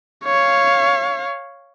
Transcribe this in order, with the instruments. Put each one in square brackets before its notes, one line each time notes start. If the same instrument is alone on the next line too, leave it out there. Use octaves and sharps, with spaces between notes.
[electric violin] C#5 F5